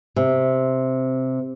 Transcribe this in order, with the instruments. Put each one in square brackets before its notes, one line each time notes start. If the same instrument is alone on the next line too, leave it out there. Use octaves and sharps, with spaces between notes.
[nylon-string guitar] C3